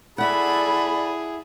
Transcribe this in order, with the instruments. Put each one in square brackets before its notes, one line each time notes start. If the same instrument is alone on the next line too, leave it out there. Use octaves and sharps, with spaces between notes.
[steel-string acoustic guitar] E4 F#5 [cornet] G#4 [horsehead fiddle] A4 D5 [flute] B5